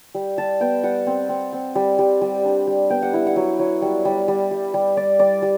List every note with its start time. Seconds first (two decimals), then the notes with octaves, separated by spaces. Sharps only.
0.15 G3
0.38 G3 A5
0.60 B3 G5
0.84 G3 F#5
1.07 C4
1.29 C4
1.53 C4
1.75 G3
1.99 G3
2.21 G3
2.45 D4
2.67 G3
2.90 B3 G5
3.02 F#5
3.13 E4 E5
3.27 F#5
3.36 F#3
3.59 F#3
3.82 G3
4.05 G3
4.28 G3
4.51 G3
4.74 G3
4.97 G3 D5
5.19 G3 D5
5.42 G3